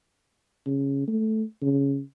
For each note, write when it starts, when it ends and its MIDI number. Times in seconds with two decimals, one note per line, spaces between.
0.66 1.06 49
1.08 1.43 57
1.62 2.00 49